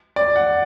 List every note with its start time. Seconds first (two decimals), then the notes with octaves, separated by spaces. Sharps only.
0.16 D5
0.36 F#5